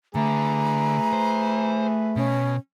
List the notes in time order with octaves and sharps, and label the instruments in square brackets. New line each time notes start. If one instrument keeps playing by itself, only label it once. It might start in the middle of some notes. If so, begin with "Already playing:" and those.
[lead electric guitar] D3 [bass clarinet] A3 [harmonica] G#4 B4 [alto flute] A#5
[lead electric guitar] C5
[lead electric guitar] B2 [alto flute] C#4